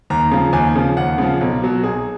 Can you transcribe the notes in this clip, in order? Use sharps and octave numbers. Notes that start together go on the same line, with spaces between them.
D#2 A#5
C#3 F3
D#2 G#5
C#3 F3
D#2 F#5
C#3 F3
B1
B2 F#3
B1 G#4